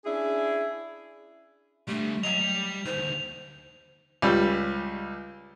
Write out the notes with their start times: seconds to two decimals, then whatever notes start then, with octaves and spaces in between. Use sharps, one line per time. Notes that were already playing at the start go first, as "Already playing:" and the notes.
0.05 C#4 D4 E4 G#4
1.88 D3 G3 A3
2.23 F#3 D#5 F5 F7
2.39 G3
2.86 D2 D#3 C5
4.22 C#2 G3